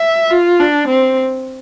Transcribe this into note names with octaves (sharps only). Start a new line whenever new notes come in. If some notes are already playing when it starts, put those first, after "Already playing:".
Already playing: E5
F4
D4
C4